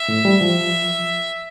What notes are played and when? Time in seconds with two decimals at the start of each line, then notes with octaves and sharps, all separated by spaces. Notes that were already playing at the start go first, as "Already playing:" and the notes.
Already playing: E5
0.08 A2
0.25 G3
0.41 F3